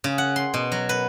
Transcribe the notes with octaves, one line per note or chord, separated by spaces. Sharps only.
C#3
F#5
C6
B2
F#3
B4